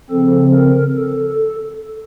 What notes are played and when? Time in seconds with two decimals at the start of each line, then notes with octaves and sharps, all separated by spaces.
0.10 C#3 F3 C4 A4
0.54 A#4
0.97 A4